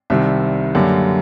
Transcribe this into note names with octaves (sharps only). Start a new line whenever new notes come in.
C2 C3 D#3 G3 E5
F#2 D3 G3 A#3